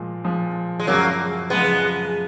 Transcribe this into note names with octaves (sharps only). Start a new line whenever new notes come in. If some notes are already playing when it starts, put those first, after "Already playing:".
Already playing: A#2 F3 G#3
A#2 F3 G#3
G#3
F#2 C#3 F3 F#3 A#3
F#2 C#3 F3 G#3 B3